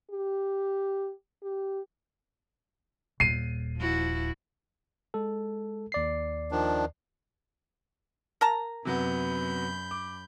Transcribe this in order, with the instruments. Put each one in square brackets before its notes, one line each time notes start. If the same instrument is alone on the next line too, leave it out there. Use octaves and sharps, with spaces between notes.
[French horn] G4
G4
[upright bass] D#1 [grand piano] C7 D#7
[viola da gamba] F3 E4 F#4
[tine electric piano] G#3 A4
D#2 D5 C7
[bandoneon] D#3 F3 D4
[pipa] A#4 A5 A#5
[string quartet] F#2 B5 G6 [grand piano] C3 F#3 B3
[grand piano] D6